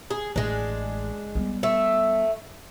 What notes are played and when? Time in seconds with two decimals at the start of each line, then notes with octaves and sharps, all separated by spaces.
0.10 G#4
0.36 A1 G#3 D4
1.35 G3 B3
1.63 A3 E5